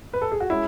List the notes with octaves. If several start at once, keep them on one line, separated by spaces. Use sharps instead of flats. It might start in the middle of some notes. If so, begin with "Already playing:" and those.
B4
A4
G#4
F#4
G#3 C#4 E4